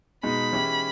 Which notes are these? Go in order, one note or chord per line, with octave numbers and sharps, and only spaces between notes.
B2 G#3 D#4 B5
E3 G#3 C#4 E4 G4